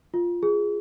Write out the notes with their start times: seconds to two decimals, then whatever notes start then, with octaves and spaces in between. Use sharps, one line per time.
0.14 F4
0.43 G#4